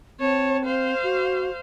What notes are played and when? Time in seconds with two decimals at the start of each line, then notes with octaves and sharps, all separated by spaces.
0.20 C4 C#5 A5
0.65 C5 F5
1.03 F#4